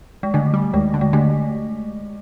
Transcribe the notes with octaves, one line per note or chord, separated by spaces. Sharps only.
G#3
D3 A3
G3
D#2 G#3
D3
G#3
D3 A3